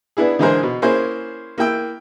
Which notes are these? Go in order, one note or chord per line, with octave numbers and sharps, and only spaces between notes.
B3 D4 E4 G#4
D3 E3 G#3 G#4 A#4 C5
B2
A#3 C#4 E4 G#4 C5
A#3 E4 G5 E6